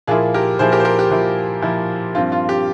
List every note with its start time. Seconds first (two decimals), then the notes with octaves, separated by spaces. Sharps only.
0.07 A#2 F3 A#3 E4 F4 G#4
0.34 G4 A#4
0.59 A#2 F3 A#3 E4 G#4 C5
0.72 G4 A#4
0.80 C5
0.85 G4 A#4
0.99 G4
1.10 A#2 F3 A#3 E4
1.62 A#2 F3 A#3 E4
2.15 G2 F3 C4 F4
2.32 F4
2.49 G4